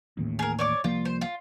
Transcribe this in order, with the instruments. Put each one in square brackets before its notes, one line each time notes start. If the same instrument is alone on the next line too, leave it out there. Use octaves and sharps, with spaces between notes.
[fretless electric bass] A1 D#2 A2
[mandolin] G#4 A#4
C#5 D5 D6
[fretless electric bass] C2 F3 A#3 [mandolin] F4
[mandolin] C5
F4